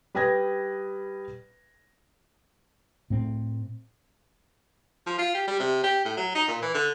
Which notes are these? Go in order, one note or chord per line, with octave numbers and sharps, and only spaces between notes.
G3 B4 G5 D#6 G#6 A#6
A2 A3 C4
F3
F4
G4
G3
C3
G4
A2
F#3
D#4
A#2
E3
D3